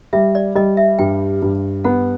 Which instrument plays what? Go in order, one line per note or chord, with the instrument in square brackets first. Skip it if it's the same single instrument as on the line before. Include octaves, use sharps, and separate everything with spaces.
[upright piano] G3 [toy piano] E5
[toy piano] D5
[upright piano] G3 [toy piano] D#5
[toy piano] E5
[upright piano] G2 [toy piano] G5
[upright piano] G2
[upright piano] B3 [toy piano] F#5